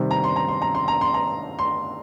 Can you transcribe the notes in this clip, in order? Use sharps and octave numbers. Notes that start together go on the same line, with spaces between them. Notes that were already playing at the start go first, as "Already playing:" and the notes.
Already playing: C3 D#3 G3 C4
A#5
C6
A#5
C6
A#5
C6
A#5
C6
A#5
C6